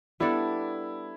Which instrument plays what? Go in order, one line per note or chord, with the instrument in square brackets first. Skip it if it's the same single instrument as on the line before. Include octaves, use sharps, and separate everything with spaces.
[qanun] G3 B3 D4 A4 [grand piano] E4